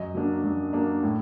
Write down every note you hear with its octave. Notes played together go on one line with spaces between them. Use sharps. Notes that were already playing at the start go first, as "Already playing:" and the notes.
Already playing: F#2 D#5
F#3 A#3 D4
F#2
F#3 A#3 D4
A2